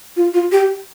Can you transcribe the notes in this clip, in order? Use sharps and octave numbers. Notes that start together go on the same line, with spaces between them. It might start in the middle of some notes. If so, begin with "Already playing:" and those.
F4
F4
G4